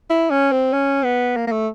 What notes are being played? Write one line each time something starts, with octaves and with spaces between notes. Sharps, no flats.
E4
C#4
C4
C#4
B3
A#3
A#3
A3